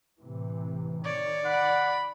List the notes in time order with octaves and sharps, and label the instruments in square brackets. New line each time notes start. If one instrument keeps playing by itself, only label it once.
[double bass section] A2 C3 E3
[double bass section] D#3 [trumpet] C#5 [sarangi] D5
[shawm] F#5 [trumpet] B5